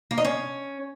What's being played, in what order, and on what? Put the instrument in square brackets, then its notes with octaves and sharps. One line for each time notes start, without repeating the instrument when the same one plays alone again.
[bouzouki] A#3
D#4
C#4